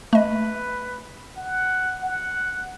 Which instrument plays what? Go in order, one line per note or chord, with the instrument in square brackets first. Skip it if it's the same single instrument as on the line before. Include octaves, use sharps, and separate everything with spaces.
[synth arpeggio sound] A3 D#5 [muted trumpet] B4
[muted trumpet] F#5
F#5